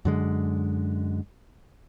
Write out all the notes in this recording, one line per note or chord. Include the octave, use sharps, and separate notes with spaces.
F#2 D3 G#3